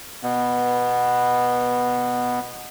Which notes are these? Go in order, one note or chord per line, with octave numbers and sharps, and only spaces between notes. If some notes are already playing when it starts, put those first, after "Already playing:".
B2 B3